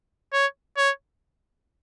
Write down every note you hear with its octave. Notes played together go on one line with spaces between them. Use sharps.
C#5
C#5